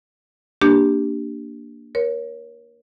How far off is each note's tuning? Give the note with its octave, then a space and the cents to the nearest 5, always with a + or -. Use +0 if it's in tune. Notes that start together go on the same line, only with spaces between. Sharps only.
A#3 +0 D4 +0 G4 +0
A#4 +30 C#5 +0